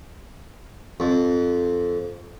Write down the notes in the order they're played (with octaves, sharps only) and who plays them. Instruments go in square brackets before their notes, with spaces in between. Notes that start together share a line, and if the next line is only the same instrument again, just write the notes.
[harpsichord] F2